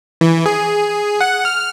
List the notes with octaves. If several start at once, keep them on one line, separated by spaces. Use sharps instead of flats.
E3
G#4
F#5
F6